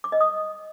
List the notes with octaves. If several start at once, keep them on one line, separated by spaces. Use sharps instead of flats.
D6
D#5
D#6